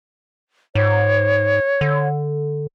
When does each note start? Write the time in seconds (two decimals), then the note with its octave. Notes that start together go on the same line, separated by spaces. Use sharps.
0.75 G#2 C#5
1.81 D3